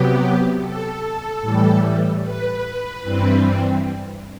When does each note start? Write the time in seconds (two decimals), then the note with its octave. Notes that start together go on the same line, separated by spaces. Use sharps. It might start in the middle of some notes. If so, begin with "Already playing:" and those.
Already playing: C3 F#3 B3 G4
0.60 A4
1.41 A2 E3 G3
2.22 B4
3.03 G2 E3 G3 C4